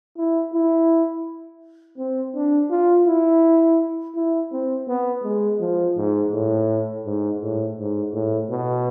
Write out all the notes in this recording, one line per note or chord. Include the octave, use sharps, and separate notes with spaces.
E4
E4
C4
D4
F4
E4
E4
C4
B3
G#3
F3
G#2
A2
G#2
A2
G#2
A2
B2